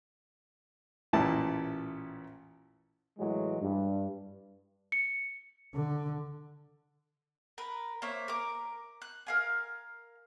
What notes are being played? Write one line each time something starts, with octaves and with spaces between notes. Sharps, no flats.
A1 A#2 E4 A5
A2 E3 F#3 G#3
G2
C#7
D3
A#4 B4
A#3 C5 C#5 E5
A#4 D6
F#6
A#4 F5 G#5